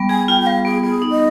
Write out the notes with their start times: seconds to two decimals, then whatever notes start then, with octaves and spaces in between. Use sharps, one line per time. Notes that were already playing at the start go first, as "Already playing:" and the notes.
Already playing: G3 B3
0.09 G#4 G#5
0.28 F4 G5
0.41 G5
0.46 G3 F5
0.65 B3 G#4
0.83 B3 G#4
1.02 D#4
1.11 D#5